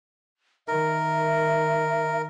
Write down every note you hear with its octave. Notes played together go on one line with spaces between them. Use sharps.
D#3 A#4 E5